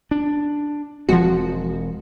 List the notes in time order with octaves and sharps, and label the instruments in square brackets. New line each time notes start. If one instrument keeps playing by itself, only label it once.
[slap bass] D4
[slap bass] E1 G#3 C4 [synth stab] F3 F#4